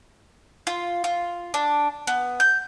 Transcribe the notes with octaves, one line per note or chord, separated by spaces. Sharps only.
F4
F4
D4
B3
G6